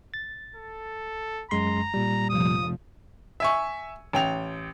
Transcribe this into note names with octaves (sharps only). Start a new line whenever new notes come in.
A6
A4
F#2 G#3 A#5 C6
A#2 G3
F1 F3 D#6
E5 G#5 C#6
A1 G5 F7